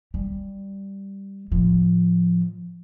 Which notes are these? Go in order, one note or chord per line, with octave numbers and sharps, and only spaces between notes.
G3
A2 F3